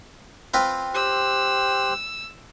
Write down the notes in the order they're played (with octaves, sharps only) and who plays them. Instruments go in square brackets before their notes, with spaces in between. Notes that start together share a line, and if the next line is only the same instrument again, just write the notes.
[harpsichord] C4 F4 B4
[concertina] G4 C5 F#6 [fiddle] E6